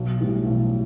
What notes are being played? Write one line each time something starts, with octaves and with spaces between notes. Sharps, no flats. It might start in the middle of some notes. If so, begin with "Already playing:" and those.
Already playing: B1
A2 E3 G3
B1